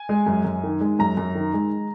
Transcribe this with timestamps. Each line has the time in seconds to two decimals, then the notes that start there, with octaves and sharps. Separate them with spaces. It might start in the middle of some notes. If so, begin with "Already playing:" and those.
Already playing: G#5
0.09 G#3
0.27 F#2
0.45 F#2
0.64 D#3
0.81 G#3
0.99 F#2 A#5
1.17 F#2
1.35 D#3
1.53 G#3